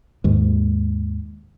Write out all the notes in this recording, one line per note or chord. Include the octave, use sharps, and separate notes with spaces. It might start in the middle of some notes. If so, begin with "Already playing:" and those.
D#2 G#2